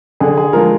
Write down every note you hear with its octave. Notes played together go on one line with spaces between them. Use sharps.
D3 G#4
G#4
F3 G#3 A#4